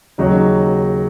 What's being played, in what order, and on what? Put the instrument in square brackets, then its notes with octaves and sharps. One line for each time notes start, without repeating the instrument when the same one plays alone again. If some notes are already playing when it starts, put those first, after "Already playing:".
[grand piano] D#2 C#3 F#3 D#4